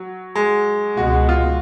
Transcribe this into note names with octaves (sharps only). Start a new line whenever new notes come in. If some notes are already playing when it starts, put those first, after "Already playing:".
Already playing: F#3
G#3
C#2 B2 G#3 F#4
F4